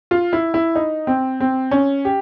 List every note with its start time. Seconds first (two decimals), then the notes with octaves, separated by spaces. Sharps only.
0.11 F4
0.33 E4
0.54 E4
0.75 D#4
1.07 C4
1.40 C4
1.71 C#4
2.05 G4